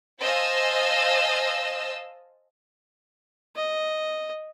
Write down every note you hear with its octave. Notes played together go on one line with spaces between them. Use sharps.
C5 D#5 F5 G#5 A5 E6
D#5